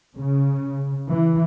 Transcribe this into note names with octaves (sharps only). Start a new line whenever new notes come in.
C#3
E3